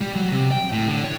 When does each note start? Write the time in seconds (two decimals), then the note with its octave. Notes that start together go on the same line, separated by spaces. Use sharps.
0.01 G3
0.16 F#3
0.32 C3
0.52 G5
0.72 A2
0.87 D3
1.04 C#5